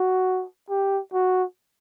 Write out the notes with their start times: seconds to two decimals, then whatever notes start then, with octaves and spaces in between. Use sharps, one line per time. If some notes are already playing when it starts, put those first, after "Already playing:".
Already playing: F#4
0.70 G4
1.13 F#4